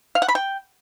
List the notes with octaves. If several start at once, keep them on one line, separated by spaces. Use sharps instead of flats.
F5
F#5
B5
G5